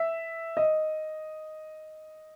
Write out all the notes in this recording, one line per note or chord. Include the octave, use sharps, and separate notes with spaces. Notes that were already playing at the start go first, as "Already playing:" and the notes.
Already playing: E5
D#5